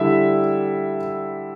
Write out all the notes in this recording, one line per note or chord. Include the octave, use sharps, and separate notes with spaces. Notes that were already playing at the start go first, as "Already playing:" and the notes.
Already playing: D3 G3 E4 E5